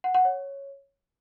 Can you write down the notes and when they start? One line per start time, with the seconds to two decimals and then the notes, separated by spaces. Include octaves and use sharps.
0.04 F#5
0.14 F#5
0.25 C#5